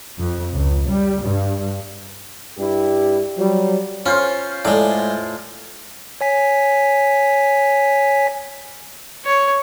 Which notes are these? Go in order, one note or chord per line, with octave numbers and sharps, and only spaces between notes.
F2
C#2
G3
G2
G2 G3 E4 G4
F#3 G3
C#4 F4 C5
A2 G#3 D5
C#5 G#5 B6
C#5